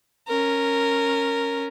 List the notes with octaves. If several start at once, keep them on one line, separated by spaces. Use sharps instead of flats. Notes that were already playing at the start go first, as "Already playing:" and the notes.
C#4 A#4